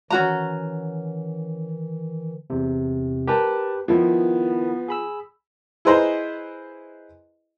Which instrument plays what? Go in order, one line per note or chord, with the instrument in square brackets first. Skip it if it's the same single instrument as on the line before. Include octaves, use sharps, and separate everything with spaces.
[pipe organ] D#3 E3 [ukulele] C#4 F#4 A#5
[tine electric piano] E2 C3
[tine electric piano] G4 B4 [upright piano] A#4 A5
[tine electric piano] D#3 E4 [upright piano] F3 [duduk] B3
[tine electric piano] G#4 B5 E6
[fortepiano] E4 G#4 B4 C5 D#5 A#5